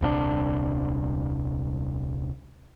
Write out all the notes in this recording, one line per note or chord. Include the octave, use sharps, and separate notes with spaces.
D#1 C2 A#2 D4